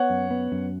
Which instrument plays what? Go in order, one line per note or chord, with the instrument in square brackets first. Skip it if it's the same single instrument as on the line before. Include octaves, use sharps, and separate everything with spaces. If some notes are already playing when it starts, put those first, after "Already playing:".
Already playing: [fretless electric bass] B3 [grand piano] C#5 F#5
[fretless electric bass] F#2
B3
F#2